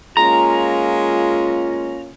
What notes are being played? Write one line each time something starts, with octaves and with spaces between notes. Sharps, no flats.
G#3 A#3 C#4 F4 A#5